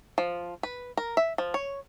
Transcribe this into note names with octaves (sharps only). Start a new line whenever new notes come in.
F3
B4
A#4
E5
F3
C#5